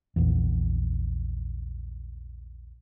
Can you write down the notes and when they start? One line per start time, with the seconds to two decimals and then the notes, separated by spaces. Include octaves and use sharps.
0.16 A#1 E2